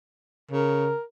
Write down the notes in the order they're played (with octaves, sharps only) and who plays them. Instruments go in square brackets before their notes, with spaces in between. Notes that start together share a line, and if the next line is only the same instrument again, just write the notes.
[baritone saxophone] C#3 [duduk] A#4